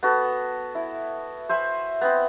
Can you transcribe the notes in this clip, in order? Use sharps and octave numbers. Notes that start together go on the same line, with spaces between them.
B3 F#4 A4
E4
C5 E5 G#5 B5
B3 C4 B5